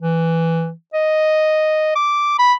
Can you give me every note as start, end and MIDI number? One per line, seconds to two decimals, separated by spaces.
0.02 0.71 52
0.94 1.92 75
1.96 2.34 86
2.39 2.53 83